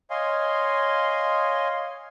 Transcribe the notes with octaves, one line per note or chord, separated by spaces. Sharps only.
C#5 D#5 F5 G#5 C6